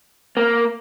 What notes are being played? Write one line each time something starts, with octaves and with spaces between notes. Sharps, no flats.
A#3